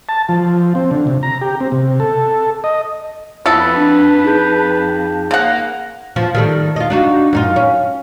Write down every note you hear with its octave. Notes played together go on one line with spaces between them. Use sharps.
A5
F3
C4
D3
C3
A#5
G4
C4
C3
A4
D#5
F2 B3 E4 F4 A4 B4
D4
D#4 G#4 G6
C#3 A#3 F#5
F3
D#3 G3 A3
F4 D#5
D4 D#4 F#4
F#2 D#4 F4
C#4